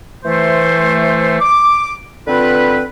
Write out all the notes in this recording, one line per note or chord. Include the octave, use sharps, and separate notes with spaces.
E3 A3 C5
D6
D3 C4 F4 B4